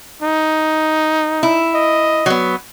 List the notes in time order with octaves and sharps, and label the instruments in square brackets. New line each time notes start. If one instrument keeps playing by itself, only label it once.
[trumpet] D#4
[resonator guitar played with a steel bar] E4
[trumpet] D#5
[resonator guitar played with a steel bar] F#3 B3